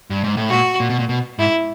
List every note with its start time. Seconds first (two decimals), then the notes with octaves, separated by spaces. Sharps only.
0.10 G2
0.24 G#2
0.37 A2
0.49 A#2 F#4
0.80 A#2
0.90 B2
0.99 A#2
1.09 B2
1.39 G#2 E4